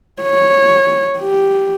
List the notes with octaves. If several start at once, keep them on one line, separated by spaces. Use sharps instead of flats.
C#5
G4